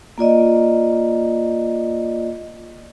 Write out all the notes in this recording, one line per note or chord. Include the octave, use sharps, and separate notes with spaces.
A#3 F4 D5 D#5